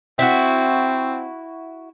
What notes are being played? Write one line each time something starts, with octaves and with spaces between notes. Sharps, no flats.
C4 E4 F#4